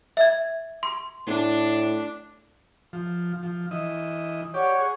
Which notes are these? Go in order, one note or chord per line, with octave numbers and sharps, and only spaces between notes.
E5 G#6
C6
A2 D4
F3
F3
E3 D#5
G4 C#5 D5 F#5 C#6
G#4